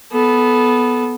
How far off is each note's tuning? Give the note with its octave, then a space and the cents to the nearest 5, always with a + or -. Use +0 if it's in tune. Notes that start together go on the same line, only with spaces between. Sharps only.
B3 +0 A4 -25